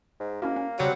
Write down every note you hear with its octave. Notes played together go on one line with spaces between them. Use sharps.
G#2
A#3 C#4 E4 F#4
C#4
C#3 F#3 G3 C4 F#5 G#6 D7